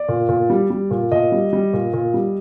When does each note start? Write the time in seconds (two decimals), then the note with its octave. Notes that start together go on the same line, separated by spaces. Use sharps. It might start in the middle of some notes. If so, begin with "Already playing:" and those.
Already playing: D5
0.09 A#2
0.29 A#2
0.50 G3
0.70 G3
0.91 A#2
1.12 A#2 D#5
1.32 G3
1.53 G3
1.73 A#2
1.93 A#2
2.14 G3